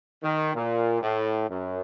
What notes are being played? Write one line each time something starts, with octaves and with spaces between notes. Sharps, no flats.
D#3
A#2
A2
F#2